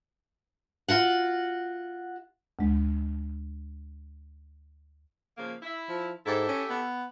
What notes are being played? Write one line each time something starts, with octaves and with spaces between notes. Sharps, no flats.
F4 F#4 F#5
D2 G#3
C#3 F3 A#3
E4
F3
G#2 E4 G4 A4
C#4
B3